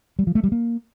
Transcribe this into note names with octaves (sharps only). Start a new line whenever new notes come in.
G3
F3
A3
G3
A#3